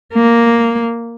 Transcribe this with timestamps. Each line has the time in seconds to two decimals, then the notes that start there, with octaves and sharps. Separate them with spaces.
0.14 A#3